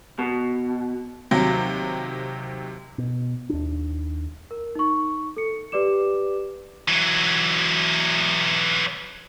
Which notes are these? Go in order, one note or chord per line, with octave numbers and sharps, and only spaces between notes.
B2
D#2 C3 F#3
B2
D#2 D4
A#4
D#4 C#6
A4 C#7
G4 B4 D5 D6 E7
E3 F#3